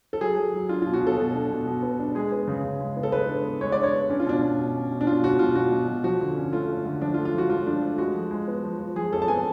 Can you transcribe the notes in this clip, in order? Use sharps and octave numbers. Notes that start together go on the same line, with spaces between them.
A4
F#3 G#4
F#3
F#3
D4 F4
B2 F4
F#4
B2
A4
B2
D4
B2
B2
B3
D4
G#3 G#4
B3
C#3
C#3
G#3
B3
A4
G#3 B4
D4
B3
G#3 C#5
D4 D5
C#5
B3
C#4 D4
F4
B2 D4
B2
B2
C#4
B2
D4
B2 F4
B2 F#4
B2 F4
B2 F#4
B2
B2
F3 F#4
D3
C#4
A3 F4
A3
D3
F3 D4
F4
A3
F4
F3 F#4
A3 F4
F3 D4
A3
G#3 F#4
F3
G#3
B3
F3
F3
F3 G#4
F2 A4
A5
B3 G#5